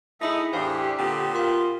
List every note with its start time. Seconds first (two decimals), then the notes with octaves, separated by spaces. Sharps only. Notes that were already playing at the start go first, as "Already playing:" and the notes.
0.21 A3 D#4 E4 G#4 E5 B5 A#6
0.53 E2 A2 E3 D4 G4 C5 F5
0.99 A#2 D3 B3 C4
1.35 F4 A#4 C6